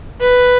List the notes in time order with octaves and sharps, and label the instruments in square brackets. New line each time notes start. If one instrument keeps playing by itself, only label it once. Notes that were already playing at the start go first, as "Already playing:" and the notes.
[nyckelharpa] B4